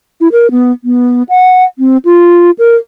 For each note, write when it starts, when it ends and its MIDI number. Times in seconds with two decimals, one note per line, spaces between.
0.21 0.28 64
0.32 0.51 70
0.51 0.72 59
0.84 1.23 59
1.29 1.64 78
1.79 1.97 60
2.05 2.51 65
2.59 2.75 70